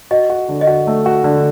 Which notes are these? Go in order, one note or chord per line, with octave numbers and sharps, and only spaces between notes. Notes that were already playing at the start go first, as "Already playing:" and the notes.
F#4 D#5
F#4
D3
D#5
F#4
A3
F#4
D3